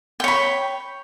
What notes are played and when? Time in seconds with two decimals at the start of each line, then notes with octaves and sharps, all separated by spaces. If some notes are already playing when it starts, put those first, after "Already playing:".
0.20 G5
0.24 C#5
0.28 B5